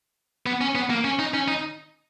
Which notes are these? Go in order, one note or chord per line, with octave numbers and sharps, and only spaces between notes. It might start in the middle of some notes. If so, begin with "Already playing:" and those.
B3
C#4
B3
A#3
C#4
D#4
C#4
D#4